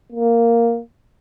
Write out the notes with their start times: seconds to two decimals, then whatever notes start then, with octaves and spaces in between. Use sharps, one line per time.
0.12 A#3